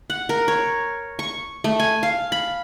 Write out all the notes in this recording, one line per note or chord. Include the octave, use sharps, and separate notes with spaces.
F#5
A#4
C#5
C#6
A3
G#5
F5
B5